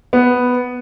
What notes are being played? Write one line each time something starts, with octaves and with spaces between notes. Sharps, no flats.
B3